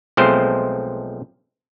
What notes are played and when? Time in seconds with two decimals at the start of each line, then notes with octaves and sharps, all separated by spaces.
0.17 B1 F3 G#3 A3 C4 C5